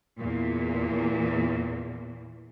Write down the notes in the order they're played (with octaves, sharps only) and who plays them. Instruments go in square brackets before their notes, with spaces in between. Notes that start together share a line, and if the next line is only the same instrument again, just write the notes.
[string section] E2 A#2